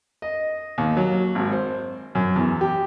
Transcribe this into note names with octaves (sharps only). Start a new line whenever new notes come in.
D#5
D#2
F#3
G#1
C5
F#2
E2
G4